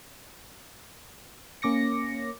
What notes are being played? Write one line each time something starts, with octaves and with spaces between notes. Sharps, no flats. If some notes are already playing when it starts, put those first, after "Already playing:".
A#3 C#4 D6 A#6 C#7